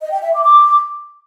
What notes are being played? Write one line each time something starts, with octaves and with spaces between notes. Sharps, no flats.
D#5
G5
E5
D6
D6